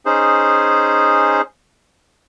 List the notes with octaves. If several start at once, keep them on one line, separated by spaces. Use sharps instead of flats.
C#4 D#4 G#4 C5